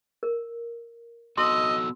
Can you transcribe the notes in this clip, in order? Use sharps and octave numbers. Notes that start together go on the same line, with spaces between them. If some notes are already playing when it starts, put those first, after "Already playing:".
A#4
B3 F#4 A4 D#5 C6 E6